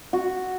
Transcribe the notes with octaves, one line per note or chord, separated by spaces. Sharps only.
F#4